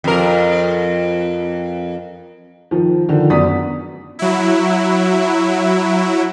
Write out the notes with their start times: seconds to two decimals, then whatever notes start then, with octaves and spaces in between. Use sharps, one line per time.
0.04 F2 A#4
2.71 D#3 F3
3.09 D3 D#3 F3
3.30 F#2 B3 D5 D#6 B6
4.19 F#3 E4